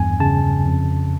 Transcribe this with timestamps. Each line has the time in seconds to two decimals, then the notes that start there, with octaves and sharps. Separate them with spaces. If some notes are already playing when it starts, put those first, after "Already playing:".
Already playing: E2 G2 G#5
0.20 C#3 A5
0.66 F2